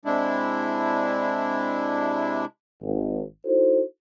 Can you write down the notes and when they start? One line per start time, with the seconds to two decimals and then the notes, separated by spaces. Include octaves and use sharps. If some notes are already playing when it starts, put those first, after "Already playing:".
0.05 C3 G#3 D4 E4
2.82 G#1
3.45 D#4 E4 F#4 A4 C5